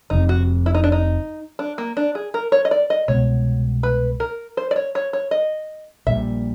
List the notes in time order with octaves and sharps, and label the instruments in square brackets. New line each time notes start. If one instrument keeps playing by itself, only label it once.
[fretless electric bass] F1 F2 C3 [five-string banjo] D#4
[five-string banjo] F#4
E4
D#4
D4
D#4
D4
A#3
D4
G#4
A#4
C#5
D#5
D5
D#5
[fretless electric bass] C2 B2 G#3 B3 [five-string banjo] C#5
[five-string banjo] B4
A#4
C5
D5
C#5
C#5
C#5
D#5
[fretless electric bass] A#1 A#2 G3 [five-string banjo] E5